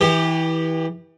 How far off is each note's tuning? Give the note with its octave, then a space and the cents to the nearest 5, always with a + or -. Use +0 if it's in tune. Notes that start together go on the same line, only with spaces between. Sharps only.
E3 -20 G4 +0 D6 +45